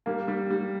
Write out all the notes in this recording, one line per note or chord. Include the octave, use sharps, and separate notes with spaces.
G3 A#3
G3
G3